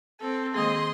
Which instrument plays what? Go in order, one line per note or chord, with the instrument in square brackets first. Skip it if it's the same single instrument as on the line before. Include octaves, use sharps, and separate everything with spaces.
[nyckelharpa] C4 [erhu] A4
[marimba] D#3 G#3 A#3 [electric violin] G#4 D#5 [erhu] C6